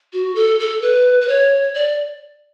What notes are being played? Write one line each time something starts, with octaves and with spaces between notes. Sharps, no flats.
F#4
A4
A4
B4
B4
C#5
D5